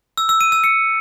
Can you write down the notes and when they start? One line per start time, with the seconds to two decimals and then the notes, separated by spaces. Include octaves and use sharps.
0.17 E6
0.29 E6
0.41 D#7
0.52 E6
0.64 C#7